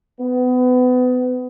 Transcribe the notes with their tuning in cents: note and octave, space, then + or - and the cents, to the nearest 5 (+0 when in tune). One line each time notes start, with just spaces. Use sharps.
B3 +30